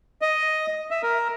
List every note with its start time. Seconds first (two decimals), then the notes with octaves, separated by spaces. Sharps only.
0.22 D#5
0.91 E5
1.03 A#4